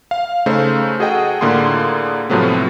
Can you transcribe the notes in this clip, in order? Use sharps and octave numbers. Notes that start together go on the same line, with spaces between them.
F5
C#3 A3 D#4 C5
F#4 G#4 A4 D#5 F#5 G5
A2 D3 A#3 F4 G#4 C6
A2 C3 F3 F#3 A3 B3